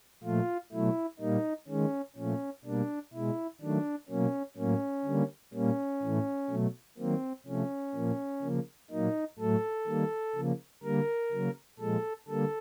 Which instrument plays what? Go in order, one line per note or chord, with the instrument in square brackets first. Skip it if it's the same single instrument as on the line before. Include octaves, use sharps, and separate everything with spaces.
[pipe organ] A#2 F3 A3 F4
B2 F#3 A3 E4
A#2 G3 A#3 D#4
D#3 G#3 C#4
A#2 F3 A3 C#4
B2 G3 A#3 D4
B2 G#3 E4
D#3 F#3 A3 D4
B2 F#3 A#3 C#4
A2 F#3 A#3 C#4
D3 G3 A#3
A#2 G3 A#3 C#4
A2 E3 A3
B2 F#3 A3
D#3 F#3 A#3 C4
C3 F3 A3 C#4
A#2 F3 A#3
C#3 F3 A#3
A#2 F#3 A#3 D#4
A2 F#3 A3 A4
D#3 G3 A#3
C#3 F3 A#3
D3 G3 A#3 A#4
C#3 F#3 A#3
A#2 F3 G#3 A4
D3 G3 A#3 A4